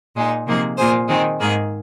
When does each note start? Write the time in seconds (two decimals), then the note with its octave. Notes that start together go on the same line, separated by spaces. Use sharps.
0.16 A#2 G#3 D#4
0.46 C3 F3 A#3 D#4 G#4
0.77 A#2 A#3 F4 G#4 C5
1.08 D#3 G#3 C4
1.40 G#2 D#3 A#3 G#4